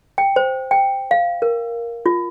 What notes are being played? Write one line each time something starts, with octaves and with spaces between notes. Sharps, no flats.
G5
C5
G5
F5
A#4
F4